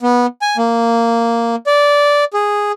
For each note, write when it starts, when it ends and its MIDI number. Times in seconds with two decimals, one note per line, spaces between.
0.02 0.26 59
0.42 0.57 80
0.57 1.56 58
1.67 2.24 74
2.33 2.72 68